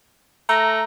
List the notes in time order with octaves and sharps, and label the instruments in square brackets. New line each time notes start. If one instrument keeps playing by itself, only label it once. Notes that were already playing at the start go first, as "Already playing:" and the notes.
[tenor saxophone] A3 [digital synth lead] A#5